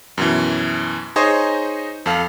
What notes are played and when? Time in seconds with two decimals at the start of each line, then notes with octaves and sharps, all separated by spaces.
0.18 F#2 B2 E3
1.16 D#4 G#4 C5 C#5 D#5
2.06 F2 A4 F5